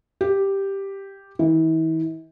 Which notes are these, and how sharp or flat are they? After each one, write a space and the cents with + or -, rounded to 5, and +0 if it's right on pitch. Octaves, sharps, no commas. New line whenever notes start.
G4 +0
E3 -40